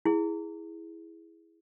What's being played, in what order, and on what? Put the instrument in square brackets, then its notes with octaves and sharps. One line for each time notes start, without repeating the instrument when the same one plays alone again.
[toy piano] E4 G#4